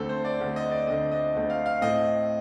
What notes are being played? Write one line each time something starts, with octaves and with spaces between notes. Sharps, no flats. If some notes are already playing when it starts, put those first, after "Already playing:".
Already playing: D2 D3 A3 C4 A4
C5
D5
D2 D3 A3 C4
D#5
D5
D2 D3 A3 C4 D#5
D#5
D2 D3 A3 C4
F5
F5
A2 A3 C4 D#5